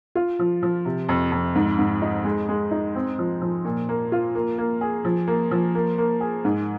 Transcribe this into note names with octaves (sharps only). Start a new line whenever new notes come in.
F4
F3
F3
C3
F2
F2
G#2
G#2
D#4
G#3
G#3
D#4
C4
F3
F3
A#2
A#3
F4
A#3
A#3
G#4
F3
A#3
F3
A#3
A#3
G#4
G#2